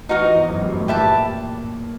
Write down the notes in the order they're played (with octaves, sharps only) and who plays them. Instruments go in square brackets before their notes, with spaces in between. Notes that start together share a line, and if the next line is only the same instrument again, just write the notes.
[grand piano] E3 [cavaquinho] D#4 F#4 A#4 D#5
[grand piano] F3
E2 E3
F#2 F#3
G2 G3
A2 A3
[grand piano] A#2 A#3 [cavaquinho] G4 B4 E5 A5